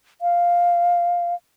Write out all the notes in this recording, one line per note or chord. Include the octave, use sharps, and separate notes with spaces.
F5